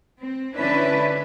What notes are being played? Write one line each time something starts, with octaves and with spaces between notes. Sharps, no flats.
C4
D3 C#4 D4 E4 B4